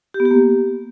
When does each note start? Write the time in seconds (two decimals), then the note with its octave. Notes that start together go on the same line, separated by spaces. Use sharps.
0.14 G4
0.20 B3
0.25 G4
0.31 A#3